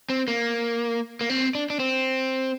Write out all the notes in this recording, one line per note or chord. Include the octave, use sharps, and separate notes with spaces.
C4
A#3
A#3
C4
D4
D4
C4